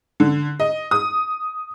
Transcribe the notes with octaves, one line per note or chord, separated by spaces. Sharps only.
D3
D#5
D#6